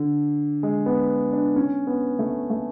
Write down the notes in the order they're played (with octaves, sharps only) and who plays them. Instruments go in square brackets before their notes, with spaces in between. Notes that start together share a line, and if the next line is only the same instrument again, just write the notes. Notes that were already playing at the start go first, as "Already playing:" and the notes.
Already playing: [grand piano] D3
G#3
B3
D4
C#4
B3
A3
A3